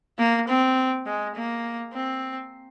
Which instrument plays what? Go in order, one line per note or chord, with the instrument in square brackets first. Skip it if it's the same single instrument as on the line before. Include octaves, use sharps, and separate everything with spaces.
[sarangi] A#3
C4
G#3
A#3
C4